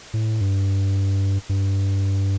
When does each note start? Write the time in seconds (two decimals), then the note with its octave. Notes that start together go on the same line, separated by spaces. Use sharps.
0.14 A2
0.41 G2
1.49 G2